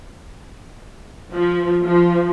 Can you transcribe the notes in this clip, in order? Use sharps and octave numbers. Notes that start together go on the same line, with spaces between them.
F3
F3